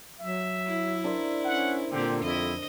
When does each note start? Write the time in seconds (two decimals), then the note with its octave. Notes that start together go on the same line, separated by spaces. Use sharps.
0.20 F#3 E5
0.67 E4
1.04 D4 A#4 C5
1.44 C#4 F#5
1.91 A#2 D3 C4 G4
2.23 F2 E4 D#5